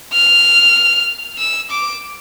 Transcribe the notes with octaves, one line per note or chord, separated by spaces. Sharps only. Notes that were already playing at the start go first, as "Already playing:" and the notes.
F6
E6
D6